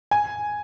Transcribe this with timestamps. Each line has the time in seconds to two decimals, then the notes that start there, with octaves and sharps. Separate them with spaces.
0.11 G#5